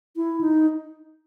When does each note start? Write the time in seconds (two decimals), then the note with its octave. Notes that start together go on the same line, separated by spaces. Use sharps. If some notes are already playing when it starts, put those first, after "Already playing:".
0.16 E4
0.41 D#4